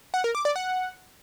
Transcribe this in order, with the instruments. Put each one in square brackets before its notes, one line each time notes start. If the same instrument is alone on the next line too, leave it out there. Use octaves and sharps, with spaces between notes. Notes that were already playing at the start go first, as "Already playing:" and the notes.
[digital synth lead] F#5
A#4
D6
D5
F#5